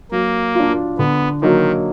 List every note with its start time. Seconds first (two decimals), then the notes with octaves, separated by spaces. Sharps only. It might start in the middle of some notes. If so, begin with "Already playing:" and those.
0.11 F#3 A#3
0.55 D4 F4
0.98 D3 B3
1.41 D#3 F#3 A#3 D#4